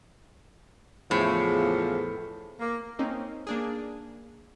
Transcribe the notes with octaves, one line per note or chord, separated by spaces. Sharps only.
E2 A2 C#3 F3
A#3
A#3 C4 C#4 D#4
A#3 D4 G#4